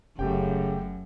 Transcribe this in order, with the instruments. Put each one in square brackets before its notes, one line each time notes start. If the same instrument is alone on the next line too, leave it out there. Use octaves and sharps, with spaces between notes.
[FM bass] F1 [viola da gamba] F#2 [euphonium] C#3 [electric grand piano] A3 G4 G5